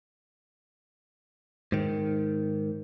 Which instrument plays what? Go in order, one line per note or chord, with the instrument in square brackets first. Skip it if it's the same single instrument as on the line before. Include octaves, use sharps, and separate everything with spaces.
[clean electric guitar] G#2 D#3